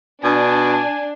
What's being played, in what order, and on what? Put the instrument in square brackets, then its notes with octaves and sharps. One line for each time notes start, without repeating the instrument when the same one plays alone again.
[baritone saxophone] B2 [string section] D4 [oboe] G#5